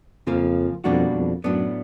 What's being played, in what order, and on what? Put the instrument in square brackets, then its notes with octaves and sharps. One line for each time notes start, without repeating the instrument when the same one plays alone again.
[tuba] F2 [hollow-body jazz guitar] C#3 F3 A#3
[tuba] F2 [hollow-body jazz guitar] B2 G3 A#3 D4 F#4
[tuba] F2
[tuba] F#2 [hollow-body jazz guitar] A2 F#3 B3 D4